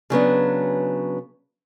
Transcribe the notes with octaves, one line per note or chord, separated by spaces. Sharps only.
C#3 F#3 B3 D4